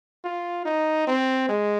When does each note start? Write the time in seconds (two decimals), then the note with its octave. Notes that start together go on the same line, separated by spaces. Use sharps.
0.24 F4
0.66 D#4
1.07 C4
1.49 G#3